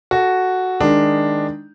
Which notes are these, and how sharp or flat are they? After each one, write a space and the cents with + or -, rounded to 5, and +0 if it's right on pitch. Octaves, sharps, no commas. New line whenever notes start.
F#4 +0 A4 -5
D#3 +5 G#3 +0 D4 +5